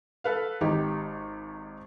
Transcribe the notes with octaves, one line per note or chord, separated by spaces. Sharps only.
A4 B4 F5
G#1 D#4 G4